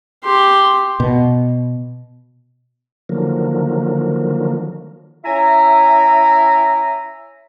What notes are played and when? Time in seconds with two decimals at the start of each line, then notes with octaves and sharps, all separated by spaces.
0.25 G4 C6
1.00 B2
3.09 D3 D#3 F3 F#3 A#3
5.25 C#4 E4 E5 G#5 A#5